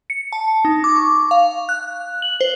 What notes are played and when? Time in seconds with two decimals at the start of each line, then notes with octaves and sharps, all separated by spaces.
0.10 C#7
0.32 A5
0.65 D#4
0.84 D6
0.96 C#6
1.31 F5
1.69 F#6
2.22 F#7
2.41 C5